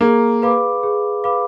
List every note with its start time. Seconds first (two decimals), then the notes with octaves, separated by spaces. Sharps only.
0.01 A#3 G#4
0.42 B4 F5 B5 D6
0.83 G#4
1.24 B4 F5 B5 D6